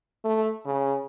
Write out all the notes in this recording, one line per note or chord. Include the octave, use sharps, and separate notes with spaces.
A3
C#3